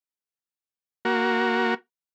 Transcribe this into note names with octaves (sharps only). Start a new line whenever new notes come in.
A#3 F#4